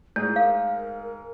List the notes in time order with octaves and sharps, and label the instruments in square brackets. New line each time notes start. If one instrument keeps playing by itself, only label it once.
[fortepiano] G#2 G#4 [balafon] A3 [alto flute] E4
[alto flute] A#4 [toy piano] F5